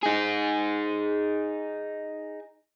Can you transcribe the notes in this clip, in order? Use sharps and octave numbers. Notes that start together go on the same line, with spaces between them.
D#4 G#4